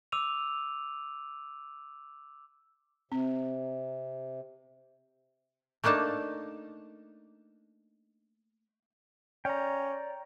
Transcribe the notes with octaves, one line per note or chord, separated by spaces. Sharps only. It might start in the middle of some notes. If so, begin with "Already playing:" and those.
D6 E6 D#7 F7
C3 C4
A3 A#3 D4 D#4 A5
C#4 D5 G5 A#5